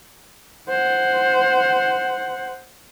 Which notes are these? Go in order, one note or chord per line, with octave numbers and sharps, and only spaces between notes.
C5 F#5